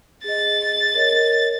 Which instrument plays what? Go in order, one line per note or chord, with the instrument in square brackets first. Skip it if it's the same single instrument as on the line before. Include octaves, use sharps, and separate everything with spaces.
[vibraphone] G#4 D#5 [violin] A6
[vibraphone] A#4 C#5 D#5